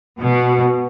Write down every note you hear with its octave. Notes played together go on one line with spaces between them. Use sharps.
B2